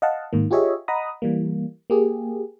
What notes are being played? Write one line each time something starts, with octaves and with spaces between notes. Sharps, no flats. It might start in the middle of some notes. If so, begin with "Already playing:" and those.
D#5 F5 F#5 A5
G#2 D#3 A#3
F4 G4 G#4 C#5 D#5 E5
D#5 F#5 A#5 B5 D#6
E3 G3 A#3
A#3 G4 G#4